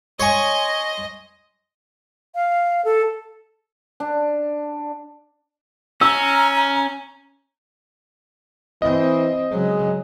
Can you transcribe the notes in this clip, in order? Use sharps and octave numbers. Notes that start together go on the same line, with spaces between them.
C#5 D#5 G#5 C6
F5
A4
D4
C#4 A#5 E6
E3 C4 D#5
C#3 F#3 G#3